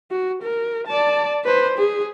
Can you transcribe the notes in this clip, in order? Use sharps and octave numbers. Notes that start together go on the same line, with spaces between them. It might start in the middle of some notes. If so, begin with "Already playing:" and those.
F#4
A#4
D5 A5
B4 C5
G#4